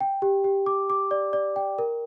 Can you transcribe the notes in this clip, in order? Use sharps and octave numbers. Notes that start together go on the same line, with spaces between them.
G5
G4
G4
D6
D6
D5
D5
G5
A#4